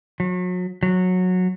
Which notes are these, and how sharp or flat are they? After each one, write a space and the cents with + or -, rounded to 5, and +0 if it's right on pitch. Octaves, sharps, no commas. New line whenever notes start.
F#3 -35
F#3 -15